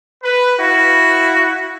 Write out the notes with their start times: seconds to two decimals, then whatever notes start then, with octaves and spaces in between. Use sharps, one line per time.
0.22 B4
0.59 E4 F#4 F5